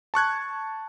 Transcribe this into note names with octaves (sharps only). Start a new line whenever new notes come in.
A5 C#6 F#6 G#6